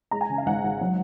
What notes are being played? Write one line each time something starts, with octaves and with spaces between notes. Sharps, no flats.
G#3 A#5
G#5
C#3
F5
G#1 F#5
G#1
F#3